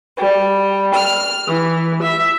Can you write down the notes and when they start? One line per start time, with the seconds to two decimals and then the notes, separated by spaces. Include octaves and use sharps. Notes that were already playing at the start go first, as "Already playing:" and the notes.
0.16 G3
0.94 F6
1.47 E3
2.03 E5